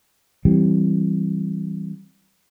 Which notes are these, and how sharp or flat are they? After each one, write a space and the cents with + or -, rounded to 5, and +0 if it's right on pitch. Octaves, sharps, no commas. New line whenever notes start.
E3 +0 G3 -10 C4 +15